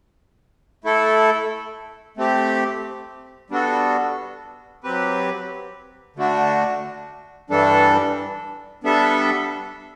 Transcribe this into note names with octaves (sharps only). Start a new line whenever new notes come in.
A3 E4 A4
A3 C4 G4
G3 B3 D4 F#4 A4
F#3 C4 G4 B4
D3 A3 D4 F#4
G2 E3 G3 D4 A4
G3 B3 D4 A4 E5